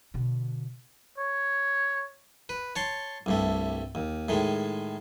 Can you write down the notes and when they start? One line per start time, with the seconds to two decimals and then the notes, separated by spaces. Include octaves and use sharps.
0.14 B2 D3
1.18 C#5
2.49 B4
2.76 C#5 A5 C6
3.26 C2 G2 A3
3.95 D#2
4.29 A2 D#3 G#3